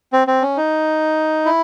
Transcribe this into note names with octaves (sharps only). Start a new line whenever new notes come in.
C4
C4
C#4
D#4
E4